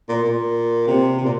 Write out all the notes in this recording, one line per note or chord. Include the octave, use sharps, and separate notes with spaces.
A#2
A#2
C3
C3
A#2